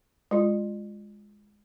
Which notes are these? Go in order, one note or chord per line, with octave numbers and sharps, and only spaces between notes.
G#3 F4